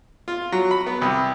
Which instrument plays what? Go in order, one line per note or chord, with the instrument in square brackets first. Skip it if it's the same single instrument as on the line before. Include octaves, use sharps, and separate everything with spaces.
[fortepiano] F4
F#3
B5
B3
C2